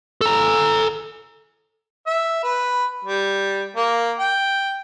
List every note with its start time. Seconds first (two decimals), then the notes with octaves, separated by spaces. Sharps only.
0.21 A4 A#5
2.07 E5
2.43 B4
3.05 G3
3.76 A#3
4.19 G5